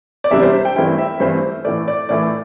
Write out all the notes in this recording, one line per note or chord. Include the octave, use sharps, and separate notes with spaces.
D5
E2 C3 G3 D4 E5
C5
C5
G5
G2 E3 A3 C4 E4 G5
E5
G2 E3 A3 C4 E4 C5
A2 E3 A3 D5
D5
A2 E3 A3 D5